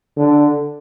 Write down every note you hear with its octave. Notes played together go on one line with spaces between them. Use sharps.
D3